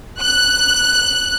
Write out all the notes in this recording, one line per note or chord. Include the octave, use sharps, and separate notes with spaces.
F#6